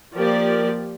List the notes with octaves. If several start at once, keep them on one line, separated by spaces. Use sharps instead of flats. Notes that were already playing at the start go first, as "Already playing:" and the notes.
F3 A#3 G4 A#4 D5